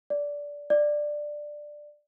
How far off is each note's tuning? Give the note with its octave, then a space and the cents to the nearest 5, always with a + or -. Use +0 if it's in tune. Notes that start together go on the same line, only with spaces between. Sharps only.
D5 -15
D5 +10